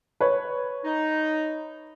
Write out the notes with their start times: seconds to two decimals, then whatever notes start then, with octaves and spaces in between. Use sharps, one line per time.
0.20 B4 C#5
0.84 D#4